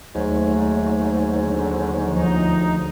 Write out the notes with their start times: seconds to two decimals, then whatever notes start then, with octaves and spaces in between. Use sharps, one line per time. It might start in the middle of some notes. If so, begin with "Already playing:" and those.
0.15 D#2 G#2 F#3 A3
1.37 D3
2.06 D2 F3 D#4